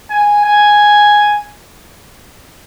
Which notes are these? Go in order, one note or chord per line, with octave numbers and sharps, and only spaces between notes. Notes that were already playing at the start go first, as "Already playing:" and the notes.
G#5
G#5